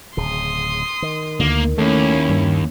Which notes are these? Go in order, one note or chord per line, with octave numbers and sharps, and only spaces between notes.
D1 C#3 C6 D#6
D#3
D2 A#3
D#2 A3 C#4 E4
G2